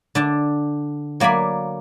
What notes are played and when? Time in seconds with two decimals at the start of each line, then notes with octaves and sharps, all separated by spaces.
0.15 D3 D4 A5
1.20 F#3 A#3 D5 G#5 B5